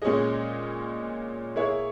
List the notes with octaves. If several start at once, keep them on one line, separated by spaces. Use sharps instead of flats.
A#2 G#3 C#4 G#4 D#5
A#3 E4 G#4 C#5